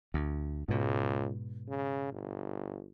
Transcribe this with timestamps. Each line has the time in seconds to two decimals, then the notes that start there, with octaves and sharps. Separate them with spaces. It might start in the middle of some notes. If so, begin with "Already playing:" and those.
0.14 D2
0.69 C#2 G#2 B2
1.69 C#3
2.13 G1